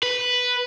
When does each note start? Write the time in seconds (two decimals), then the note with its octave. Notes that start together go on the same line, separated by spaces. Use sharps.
0.03 B4